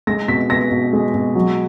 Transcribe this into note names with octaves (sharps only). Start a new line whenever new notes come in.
G#3 A#6
B2 B6
B3 A#6
B2
G#3
B2
F#3